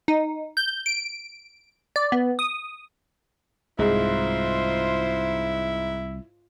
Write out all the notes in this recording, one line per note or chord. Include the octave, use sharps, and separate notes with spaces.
D#4
G6
D7
D5
B3
D#6
C2 G#2 E4 F4 C5